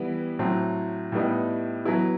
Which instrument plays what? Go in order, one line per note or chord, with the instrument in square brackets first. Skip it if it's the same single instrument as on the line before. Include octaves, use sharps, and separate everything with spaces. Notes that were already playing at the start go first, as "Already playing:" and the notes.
Already playing: [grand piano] E3 G3 B3 E4
A2 F#3 C4
A2 G3 B3 D#4
F#3 B3 E4